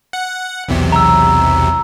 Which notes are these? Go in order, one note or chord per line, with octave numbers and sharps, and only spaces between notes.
F#5
B1 E2 C3
A#5 E6